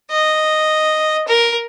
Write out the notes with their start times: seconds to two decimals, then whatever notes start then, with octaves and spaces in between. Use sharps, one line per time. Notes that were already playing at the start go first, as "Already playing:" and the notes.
0.11 D#5
1.28 A#4